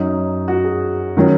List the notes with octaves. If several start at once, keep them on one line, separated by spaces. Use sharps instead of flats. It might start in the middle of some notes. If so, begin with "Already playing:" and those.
Already playing: F#2 F#3 C#4 D#4
F#4
G#4
D#3 F#3 C#4